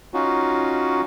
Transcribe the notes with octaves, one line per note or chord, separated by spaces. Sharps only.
C#4 D#4 F4 F#4